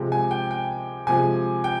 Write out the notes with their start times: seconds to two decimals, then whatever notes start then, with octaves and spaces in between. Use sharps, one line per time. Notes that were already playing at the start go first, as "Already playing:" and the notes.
Already playing: C3 F3 G#3
0.12 G#5
0.31 G5
0.51 G5
1.07 C3 F3 G#3 G#5
1.64 G5